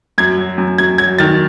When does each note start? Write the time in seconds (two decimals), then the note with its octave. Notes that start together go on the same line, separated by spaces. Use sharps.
0.18 F#2 G#6
0.37 F#3
0.58 F#2
0.78 F#2 G#6
0.98 F#3 G#6
1.19 D#3 A6